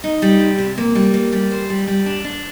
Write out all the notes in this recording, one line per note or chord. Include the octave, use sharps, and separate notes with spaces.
D#4
G3
C3
C3
A#3
G3
A#3
G3
C5
G3
G3
D4
D4